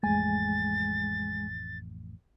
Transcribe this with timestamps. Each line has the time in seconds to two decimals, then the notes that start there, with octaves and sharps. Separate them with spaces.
0.03 A1 F2 G#3 A3 G#5 A6